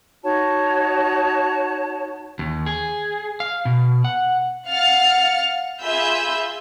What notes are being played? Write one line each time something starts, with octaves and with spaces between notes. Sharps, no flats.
D#4 F#4 C#5 A5
D#2
G#4
F5
B2
F#5
F5 F#5 F6 A6 C#7
F4 G#4 E5 B5 E6 G6